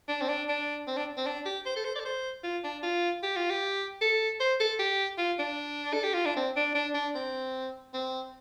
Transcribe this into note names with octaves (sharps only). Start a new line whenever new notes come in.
D4
C4
D4
D4
C4
D4
C4
D4
G4
C5
A4
C5
D5
A4
C5
F4
D4
F4
G4
F4
G4
A4
C5
A4
G4
F4
D4
A4
G4
F4
D4
C4
D4
D4
D4
C4
C4